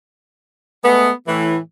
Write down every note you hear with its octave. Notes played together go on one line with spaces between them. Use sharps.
G#3 A3 B3
A2 E3